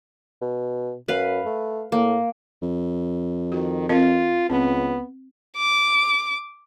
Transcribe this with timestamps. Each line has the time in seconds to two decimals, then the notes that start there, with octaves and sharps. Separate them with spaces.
0.41 B2
1.08 F#2 B4 F5
1.46 A3
1.92 A2 A#3
2.62 F2
3.52 D#3 F#4
3.89 C4 F4 A#4 D#5
4.50 C#2 B3 C4
5.58 D6